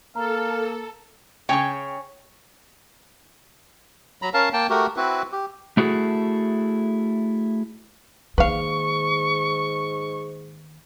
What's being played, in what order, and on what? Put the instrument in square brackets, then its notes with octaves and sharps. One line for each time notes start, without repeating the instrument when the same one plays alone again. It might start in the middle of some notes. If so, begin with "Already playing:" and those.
[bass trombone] A#3 [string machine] A4 [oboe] F5 [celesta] A#5
[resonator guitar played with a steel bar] C#3 G5 [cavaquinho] C#5 G#5 C#6
[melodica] F#3 A#5 B5
C#4 A#4 F5 A5
A#3 G5 A5
A3 F#4 G4 A#4
C4 E4 F#4 B4
G4
[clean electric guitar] A3 E4 F#4 G#4 A4
[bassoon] G#2 [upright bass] D#3 A#3 [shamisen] B4 F5 [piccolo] C#6